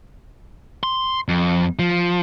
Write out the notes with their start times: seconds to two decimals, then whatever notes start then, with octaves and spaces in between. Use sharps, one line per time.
0.83 C6
1.28 F2
1.79 F3